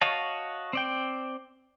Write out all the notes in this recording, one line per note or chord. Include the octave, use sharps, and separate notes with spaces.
F#4 C#5 D#5 F5 A5
C4 D5 G5